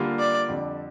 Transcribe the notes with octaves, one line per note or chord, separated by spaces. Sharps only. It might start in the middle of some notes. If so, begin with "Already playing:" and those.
Already playing: D3 G3 A#3 F4
D5
F2 D3 G3